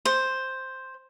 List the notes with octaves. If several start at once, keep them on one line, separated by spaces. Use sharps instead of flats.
C5